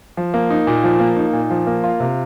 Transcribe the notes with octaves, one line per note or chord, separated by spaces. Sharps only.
F3
A#3
D#4
A#2
F3
A#3
D#4
A#2
F3
A#3
F4
C3